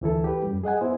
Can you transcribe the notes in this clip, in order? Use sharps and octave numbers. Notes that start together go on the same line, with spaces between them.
D2 E3 E4 A4
G4 B4
F#2 G3
G#4 D#5 F#5 G#5
B3 E4 C5